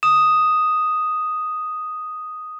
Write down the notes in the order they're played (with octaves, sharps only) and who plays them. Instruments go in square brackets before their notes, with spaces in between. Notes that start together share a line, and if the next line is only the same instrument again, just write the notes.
[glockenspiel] D#6 E7